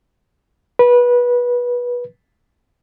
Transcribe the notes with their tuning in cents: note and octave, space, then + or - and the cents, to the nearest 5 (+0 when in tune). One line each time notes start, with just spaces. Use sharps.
B4 -20